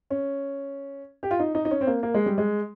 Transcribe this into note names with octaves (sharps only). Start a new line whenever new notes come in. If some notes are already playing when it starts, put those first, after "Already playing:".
C#4
G4
F4
D#4
D#4
D#4
C#4
C4
A#3
A#3
G#3
G3
G#3